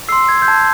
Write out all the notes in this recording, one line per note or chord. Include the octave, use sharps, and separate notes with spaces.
C6 E6 C7
G#6
G6
A5 G#6